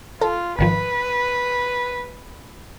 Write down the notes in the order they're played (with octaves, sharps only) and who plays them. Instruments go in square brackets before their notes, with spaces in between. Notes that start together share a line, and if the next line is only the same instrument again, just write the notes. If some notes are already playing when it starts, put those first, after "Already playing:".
[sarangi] F4 [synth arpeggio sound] A4
[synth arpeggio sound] G#1 D#3 F3 [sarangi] B4